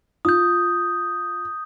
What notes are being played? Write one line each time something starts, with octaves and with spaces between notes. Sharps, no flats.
F4 D#6 G6